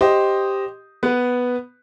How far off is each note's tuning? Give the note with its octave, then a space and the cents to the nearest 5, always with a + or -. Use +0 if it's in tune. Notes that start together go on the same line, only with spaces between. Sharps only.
G4 +0 C5 +0 D#5 +0
B3 +0 B4 +0